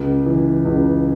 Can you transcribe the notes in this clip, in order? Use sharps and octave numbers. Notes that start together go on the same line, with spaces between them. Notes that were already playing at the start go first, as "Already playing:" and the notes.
Already playing: C#2
E3
C#2